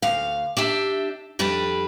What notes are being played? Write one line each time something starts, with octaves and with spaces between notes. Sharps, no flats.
D2 F5
D4 G4 E5
F2 G3 D4 B4